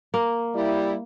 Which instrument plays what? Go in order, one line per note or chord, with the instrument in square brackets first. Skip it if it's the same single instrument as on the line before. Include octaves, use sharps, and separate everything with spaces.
[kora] A#3
[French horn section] G3 E4